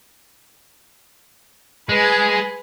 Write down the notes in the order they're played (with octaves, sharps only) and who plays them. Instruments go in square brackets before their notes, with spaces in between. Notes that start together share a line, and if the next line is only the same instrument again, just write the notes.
[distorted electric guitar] G#3 [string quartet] B4 G#5